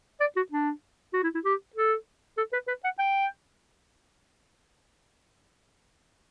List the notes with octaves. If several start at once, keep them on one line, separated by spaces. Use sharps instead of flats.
D5
F#4
D4
F#4
E4
E4
G4
A4
A4
B4
B4
F#5
G5